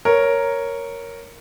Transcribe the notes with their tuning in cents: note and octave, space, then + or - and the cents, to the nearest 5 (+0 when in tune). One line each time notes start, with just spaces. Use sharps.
A#4 +0 C#5 +0